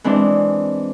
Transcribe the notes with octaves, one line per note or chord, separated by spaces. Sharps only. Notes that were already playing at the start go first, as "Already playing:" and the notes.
E3 G#3 C4 D4